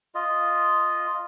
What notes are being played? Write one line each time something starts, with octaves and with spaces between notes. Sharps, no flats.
F4 D#5